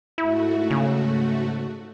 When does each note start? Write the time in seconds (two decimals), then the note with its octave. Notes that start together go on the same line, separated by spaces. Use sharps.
0.18 G#2 A3 E4 F#4
0.70 C#3